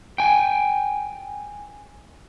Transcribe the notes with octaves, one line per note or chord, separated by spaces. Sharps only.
G5 G#5